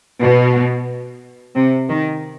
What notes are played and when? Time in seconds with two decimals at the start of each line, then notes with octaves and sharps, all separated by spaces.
0.19 B2
1.55 C3
1.89 D#3